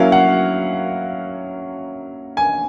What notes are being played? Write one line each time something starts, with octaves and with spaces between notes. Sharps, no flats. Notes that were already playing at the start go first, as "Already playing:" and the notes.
Already playing: F#3 A#3 C#4 E4 F5
F#5
G#5